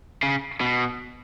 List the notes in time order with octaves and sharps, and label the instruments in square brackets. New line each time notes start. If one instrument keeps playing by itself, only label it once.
[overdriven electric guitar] C#3
B2